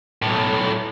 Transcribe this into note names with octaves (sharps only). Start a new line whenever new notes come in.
B1 A2